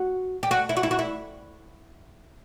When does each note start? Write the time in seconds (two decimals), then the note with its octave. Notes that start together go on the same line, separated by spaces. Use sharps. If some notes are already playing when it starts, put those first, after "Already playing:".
Already playing: F#4
0.43 G4
0.51 F#4
0.69 E4
0.77 F#4
0.83 E4
0.91 F#4
0.99 E4